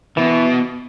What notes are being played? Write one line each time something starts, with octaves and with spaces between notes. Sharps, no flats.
B2 E3